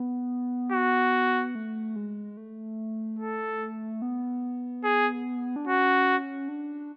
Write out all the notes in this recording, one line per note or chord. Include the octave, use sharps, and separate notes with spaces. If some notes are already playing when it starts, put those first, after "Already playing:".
Already playing: B3
F#4
A3
G#3
A3
A4
B3
G#4
D4
C#4 F#4
D4